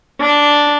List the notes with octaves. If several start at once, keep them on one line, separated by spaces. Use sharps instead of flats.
D4